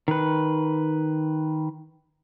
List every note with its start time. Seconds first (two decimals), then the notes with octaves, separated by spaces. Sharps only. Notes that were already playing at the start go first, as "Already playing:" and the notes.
0.08 D#3 B4